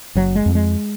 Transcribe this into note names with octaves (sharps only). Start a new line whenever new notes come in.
F#1 F#3
G#3
F2
G#3